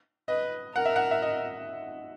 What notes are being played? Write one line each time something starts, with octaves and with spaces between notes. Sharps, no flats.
B4 D#5
A#4 F#5
E5
F#5
E5
D#5